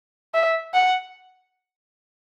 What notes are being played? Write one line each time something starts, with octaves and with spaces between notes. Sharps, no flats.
E5
F#5